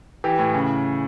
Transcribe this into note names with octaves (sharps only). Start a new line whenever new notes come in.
E3 G4
A2
C#3